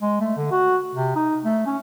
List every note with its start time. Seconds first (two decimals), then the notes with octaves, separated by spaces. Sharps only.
0.01 G#3
0.21 A3
0.37 D3
0.51 F#4
0.95 C3
1.15 D#4
1.44 A3
1.66 C#4